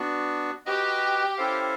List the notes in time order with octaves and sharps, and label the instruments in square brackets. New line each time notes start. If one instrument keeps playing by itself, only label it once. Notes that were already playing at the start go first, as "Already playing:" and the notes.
Already playing: [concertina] B3 D4 F#4
[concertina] F#4 B4 D#5 [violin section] G4
[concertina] C#4 E4 A4 C5 F5